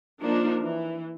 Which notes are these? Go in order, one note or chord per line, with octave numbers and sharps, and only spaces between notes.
F3 A#3 D4 D#4 A#4
E3